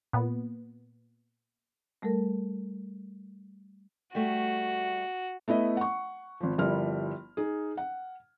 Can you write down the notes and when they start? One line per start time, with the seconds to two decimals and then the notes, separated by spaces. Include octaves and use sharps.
0.13 A#2 B3
2.02 G3 A3 A4 A#4
4.15 G3 A3 F#4
5.48 A3 B3 E4 D#5
5.77 F#5 C#6
6.40 G#1 F3
6.58 G1 F3 G3 E4 A#4 F6
7.37 D#4 G#4
7.77 F#5